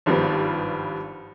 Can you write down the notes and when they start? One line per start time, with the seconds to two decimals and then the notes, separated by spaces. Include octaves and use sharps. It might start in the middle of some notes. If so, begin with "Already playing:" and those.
0.06 G#1 G2 F3 G3 B3